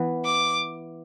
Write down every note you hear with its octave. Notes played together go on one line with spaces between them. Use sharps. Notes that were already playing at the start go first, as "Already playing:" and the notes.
Already playing: E3 B3
D6